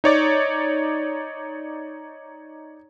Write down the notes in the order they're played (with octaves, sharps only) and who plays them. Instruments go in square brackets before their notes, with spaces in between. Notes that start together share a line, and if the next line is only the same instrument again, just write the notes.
[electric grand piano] D#4 C#5 D5